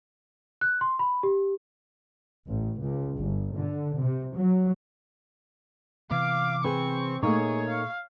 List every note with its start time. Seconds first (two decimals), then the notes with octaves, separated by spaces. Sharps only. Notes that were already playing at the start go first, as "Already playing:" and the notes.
0.61 F#6
0.81 C6
0.99 B5
1.23 G4
2.47 A1
2.81 C#2
3.17 G1
3.55 D3
3.96 C3
4.34 F#3
6.11 C3 E3 B3 F5 D6
6.64 C4 G#4 B4 C#6
7.23 A#2 A3 A#3 D#4 G#4 C#5
7.69 F5